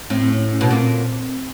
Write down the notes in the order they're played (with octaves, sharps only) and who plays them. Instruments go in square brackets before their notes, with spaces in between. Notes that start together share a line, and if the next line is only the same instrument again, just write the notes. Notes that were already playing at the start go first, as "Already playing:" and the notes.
[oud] A2 [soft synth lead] C4
[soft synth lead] C4
C#4
C#4
[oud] B2
[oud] A#2 [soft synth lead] C4